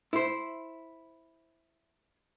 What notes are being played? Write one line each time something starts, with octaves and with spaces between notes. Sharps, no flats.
E4 C5